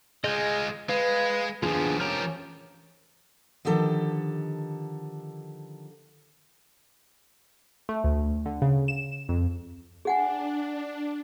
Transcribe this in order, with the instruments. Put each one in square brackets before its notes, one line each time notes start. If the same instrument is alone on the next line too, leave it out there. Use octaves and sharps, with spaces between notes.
[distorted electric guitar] G#3 F4 [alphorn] G#4 [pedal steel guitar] D#5 G6
[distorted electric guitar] G#3 [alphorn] B4 [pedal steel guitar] F5
[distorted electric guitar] D#2 F3 [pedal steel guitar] B3 D4 F4 [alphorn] G#4
[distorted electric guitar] F3 G4 [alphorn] C#4 [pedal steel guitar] A#4 A#5 F6
[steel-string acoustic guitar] D3 D#3 F3 G4 A4
[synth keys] A3
D2
D3
C#3
E7
F2
[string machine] D4 [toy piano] G#4 F#5 G#5